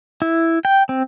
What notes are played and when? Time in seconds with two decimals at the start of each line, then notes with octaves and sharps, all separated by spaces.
0.22 E4
0.65 G5
0.89 C4